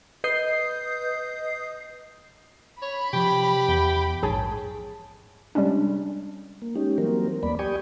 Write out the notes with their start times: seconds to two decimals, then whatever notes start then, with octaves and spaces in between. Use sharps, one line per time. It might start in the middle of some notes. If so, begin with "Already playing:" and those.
0.24 B4 D#5 D#6 G6 C7
2.82 C#5 B5
3.13 C3 F3 G4
3.69 E2
4.23 A#1 G#2 G#4 C#5 G#5 A5
5.55 C3 G3 G#3 C#4 D4
6.62 A#3
6.76 G#3 C#4 D#4 G4
6.98 E3 F#3 G3 A#3 C4 A#4
7.43 D#2 A#3 B3 D5 B5
7.59 G4 D5 G5 G#5 C#6 D#6